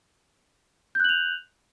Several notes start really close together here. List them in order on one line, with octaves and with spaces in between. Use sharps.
G6 F#6 F#7 F7